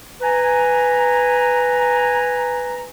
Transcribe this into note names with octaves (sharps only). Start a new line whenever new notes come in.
B4 G#5 A#5